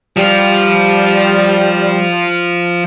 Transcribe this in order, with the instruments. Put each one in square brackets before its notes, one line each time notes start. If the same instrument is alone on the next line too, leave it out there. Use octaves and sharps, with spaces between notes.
[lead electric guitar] F3 F4 [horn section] G3